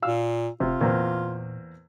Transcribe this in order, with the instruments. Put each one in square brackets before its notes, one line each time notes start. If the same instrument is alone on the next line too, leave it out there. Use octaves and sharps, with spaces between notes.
[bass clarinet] A#2 [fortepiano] F5 E6
[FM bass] F1 [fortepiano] C3 [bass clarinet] F4
[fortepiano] E2 A#3 C4 [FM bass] A#2